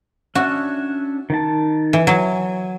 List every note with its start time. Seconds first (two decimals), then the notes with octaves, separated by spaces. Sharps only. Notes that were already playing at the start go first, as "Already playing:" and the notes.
0.35 C#4 D4 F#4 E5
1.30 D#3 A5
1.93 E3
2.07 F#3 G#5